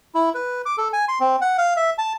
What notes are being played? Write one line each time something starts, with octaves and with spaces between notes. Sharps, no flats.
E4
B4
D6
A4
G#5
C6
C4
F#5
F5
E5
A5